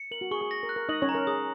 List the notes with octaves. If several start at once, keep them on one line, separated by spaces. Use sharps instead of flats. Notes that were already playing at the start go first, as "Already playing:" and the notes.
Already playing: C#7
A#4 F#7
F#4
G#4 C#6
G#4
A#6
A#4
F#6
A#4
D#4 D#5 F#7
C#4 C#5
A#5
A#4
G#4 D#6